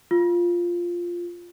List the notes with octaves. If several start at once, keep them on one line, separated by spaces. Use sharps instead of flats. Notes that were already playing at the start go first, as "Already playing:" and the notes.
F4